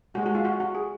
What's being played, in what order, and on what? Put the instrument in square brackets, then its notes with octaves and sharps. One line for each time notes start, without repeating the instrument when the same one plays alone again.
[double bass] G#3 [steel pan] F#4
[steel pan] F#4
F4
F#4
F#4
G#4